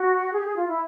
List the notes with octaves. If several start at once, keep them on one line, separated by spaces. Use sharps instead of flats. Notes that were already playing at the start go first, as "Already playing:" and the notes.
Already playing: F#4
G#4
G4
G#4
F4
E4